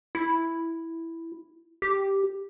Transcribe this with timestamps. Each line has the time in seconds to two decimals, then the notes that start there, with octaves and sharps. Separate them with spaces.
0.15 E4
1.82 G4